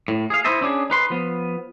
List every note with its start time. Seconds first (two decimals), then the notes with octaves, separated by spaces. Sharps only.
0.08 A2
0.30 G#4 F5
0.44 D#4 E4 C5 D#5 E5 A5
0.61 C#4 D4 G4 G#4
0.90 D#4 B4 C6
1.10 F3 B3